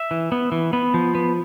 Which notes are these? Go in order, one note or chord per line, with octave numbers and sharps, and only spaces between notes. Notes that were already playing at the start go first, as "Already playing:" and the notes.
Already playing: E5
E3
B3
E3
B3
F3
B3